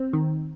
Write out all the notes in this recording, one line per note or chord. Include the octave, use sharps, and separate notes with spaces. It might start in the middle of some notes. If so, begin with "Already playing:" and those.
Already playing: C4
D#3